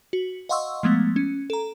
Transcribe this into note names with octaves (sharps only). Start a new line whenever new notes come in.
F#4
D#5 F5 F#5 C6 C#6 E6
F3 G#3 A3 B3
C#4
A4 A#5